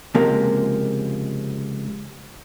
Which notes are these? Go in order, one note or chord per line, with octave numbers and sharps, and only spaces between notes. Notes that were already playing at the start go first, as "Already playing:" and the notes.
C#2 C3 F3 G#3 A#3